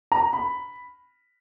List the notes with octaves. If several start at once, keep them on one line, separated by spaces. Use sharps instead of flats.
A#5
B5